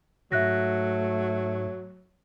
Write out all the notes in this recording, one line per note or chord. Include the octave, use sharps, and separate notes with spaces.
G#2 F#3 A3 E5 F#6 A#6